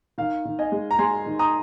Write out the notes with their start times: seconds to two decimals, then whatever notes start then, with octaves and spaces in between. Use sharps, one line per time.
0.18 D#3 F5
0.45 D#3
0.59 D#5 G#5
0.72 G#3
0.91 A#5
0.99 G#3 G#5 C6
1.26 D#3
1.39 A#5 D#6